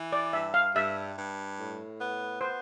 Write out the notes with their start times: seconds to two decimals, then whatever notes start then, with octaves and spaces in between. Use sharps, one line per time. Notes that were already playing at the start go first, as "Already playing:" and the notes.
Already playing: E3
0.13 D5
0.33 G2 E5
0.54 F5
0.75 G2 E5
1.17 G2
1.58 A2
2.00 B3
2.41 B3 C5